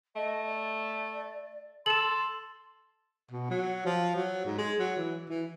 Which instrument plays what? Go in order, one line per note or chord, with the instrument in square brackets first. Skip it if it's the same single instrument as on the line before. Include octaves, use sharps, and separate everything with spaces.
[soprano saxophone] A3 [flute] D#5
[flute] D5
[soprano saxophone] A4 [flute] C6 [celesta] E7 F#7
[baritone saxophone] B2
F#3
F3
F#3
G#2
G#3
F#3
E3
E3